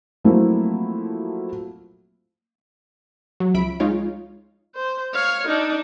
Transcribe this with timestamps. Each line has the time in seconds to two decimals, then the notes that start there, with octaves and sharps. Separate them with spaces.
0.24 F3 F#3 A3 A#3 C4 E4
3.40 F#3
3.54 C#2 F3 E5 B5 B6 D7
3.80 G#3 D#4 F4 C#5 F5
4.75 C5
5.14 C#5 F5
5.47 D4 D#4